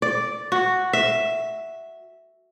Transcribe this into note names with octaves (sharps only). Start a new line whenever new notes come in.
D5
F#4
E5